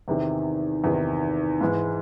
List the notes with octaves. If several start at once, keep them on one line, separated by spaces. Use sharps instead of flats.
E2 C3 D#3
E2 C3 D#3
G#2 E3 G#3